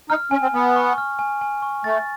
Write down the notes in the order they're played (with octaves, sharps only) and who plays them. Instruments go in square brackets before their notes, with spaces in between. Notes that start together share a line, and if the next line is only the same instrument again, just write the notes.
[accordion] D#4 [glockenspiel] F6
[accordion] C#4 [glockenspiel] G#5
[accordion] C4
[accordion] B3 [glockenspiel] G#5
[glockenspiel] C#6
F6
G#5
G#5
C#6
[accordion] A3 [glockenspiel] A6